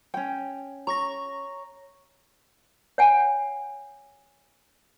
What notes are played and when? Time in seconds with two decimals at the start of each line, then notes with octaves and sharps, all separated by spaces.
0.14 C#4 G5
0.87 C#5 A#5 C#6 A#6
2.98 C#5 F#5 G#5